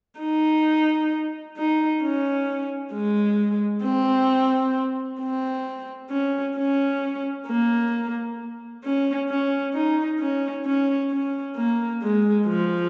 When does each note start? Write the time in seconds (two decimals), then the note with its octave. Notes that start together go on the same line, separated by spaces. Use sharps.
0.20 D#4
1.57 D#4
2.02 C#4
2.93 G#3
3.84 C4
5.21 C4
6.10 C#4
6.57 C#4
7.47 A#3
8.84 C#4
9.30 C#4
9.74 D#4
10.20 C#4
10.65 C#4
11.11 C#4
11.56 A#3
12.02 G#3
12.47 F3